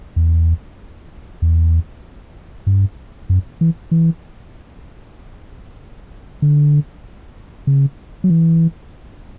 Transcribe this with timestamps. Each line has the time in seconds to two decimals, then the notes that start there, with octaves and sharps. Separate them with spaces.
0.16 E2
1.42 E2
2.67 G2
3.29 F#2
3.61 E3
3.91 E3
6.42 D3
7.67 C#3
8.24 F#3
8.30 E3